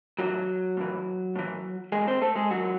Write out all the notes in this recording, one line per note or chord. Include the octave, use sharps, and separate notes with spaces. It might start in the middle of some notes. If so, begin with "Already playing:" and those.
A2 E3 F#3 F#4
A2 E3
A2 E3
A2 E3 G#3 G#4
C4 C5
A3 A4
G#3 G#4
F#2 E3 F#3 F#4